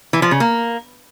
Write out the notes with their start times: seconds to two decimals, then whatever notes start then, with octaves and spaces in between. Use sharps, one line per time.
0.13 E3
0.22 F3
0.31 C#3
0.40 A#3